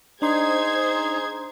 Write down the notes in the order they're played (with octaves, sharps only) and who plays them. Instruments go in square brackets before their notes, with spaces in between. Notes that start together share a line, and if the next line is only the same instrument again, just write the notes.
[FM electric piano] D4 C6 [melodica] D#4 [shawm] G#4 [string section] C5 G#6